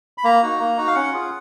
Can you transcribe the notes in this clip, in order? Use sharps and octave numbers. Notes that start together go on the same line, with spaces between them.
B5
A#3 A#5
D#4 F#4
A#3
D#4 F#4
F5
C#4 F#5
F4 G#4